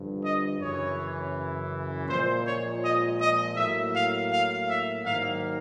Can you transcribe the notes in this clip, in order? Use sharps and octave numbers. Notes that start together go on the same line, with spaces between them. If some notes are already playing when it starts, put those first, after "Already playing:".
Already playing: G2 D3 F3
D#5
F#2 C#3 E3 C#5
A#2 F3 G#3 C5
C#5
D#5
D#5
A2 F#3 A#3 E5
F5
F5
E5
G#2 D#3 F#3 A#3 F5